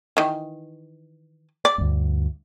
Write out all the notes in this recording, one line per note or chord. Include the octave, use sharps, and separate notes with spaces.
D#3 E3
D5
D2 G2